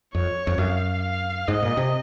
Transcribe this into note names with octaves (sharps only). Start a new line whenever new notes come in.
F2 C#5
F2
F#2 F5
F5
G#2 D#5
A#2
C3